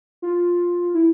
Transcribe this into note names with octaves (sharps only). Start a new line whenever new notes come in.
F4
E4